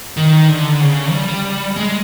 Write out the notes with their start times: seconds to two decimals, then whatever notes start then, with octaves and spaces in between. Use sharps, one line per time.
0.17 D#3
0.48 D3
0.80 C#3
1.12 G3
1.76 G#3